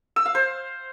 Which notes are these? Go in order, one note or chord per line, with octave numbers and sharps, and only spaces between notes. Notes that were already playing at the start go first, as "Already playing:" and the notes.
E6
F5
C5